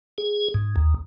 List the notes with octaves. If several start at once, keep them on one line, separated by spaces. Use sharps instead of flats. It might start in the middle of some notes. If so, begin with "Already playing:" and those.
G#4
G#2
D#2